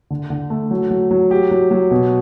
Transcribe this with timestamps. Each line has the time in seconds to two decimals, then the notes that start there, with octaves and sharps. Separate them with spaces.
0.10 D3
0.30 D3
0.50 A3
0.71 F#3
0.91 F#3
1.11 F#3
1.31 G4
1.51 F#3
1.71 F#3
1.91 B2